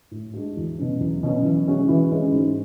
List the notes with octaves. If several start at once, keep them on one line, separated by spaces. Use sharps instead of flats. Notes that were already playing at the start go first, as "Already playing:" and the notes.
A2
G#3 D4 F#4
E2
B2 F#3 C#4
E2
B2 F#3 C#4
E3
G#3 C#4 F#4
E3
G#3 C#4 F#4
G#2